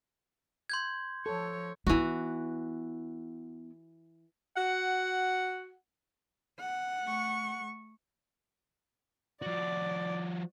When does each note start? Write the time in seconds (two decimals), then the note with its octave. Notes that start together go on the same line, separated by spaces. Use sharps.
0.70 C6 G6 G#6
1.26 F3 A4 C#5
1.87 E3 B3 E4 F#4
4.56 F#4 F#5
6.59 F#5
7.02 A3 C#6
9.42 F3 F#4 D5